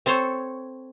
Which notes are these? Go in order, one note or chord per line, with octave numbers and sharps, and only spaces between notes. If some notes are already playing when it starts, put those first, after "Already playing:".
C4 A4 C5 C#5